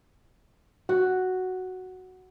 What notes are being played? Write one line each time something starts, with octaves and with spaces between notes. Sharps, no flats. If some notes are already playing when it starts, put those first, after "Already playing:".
F#4